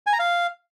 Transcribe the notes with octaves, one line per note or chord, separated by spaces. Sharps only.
G#5
A#5
F5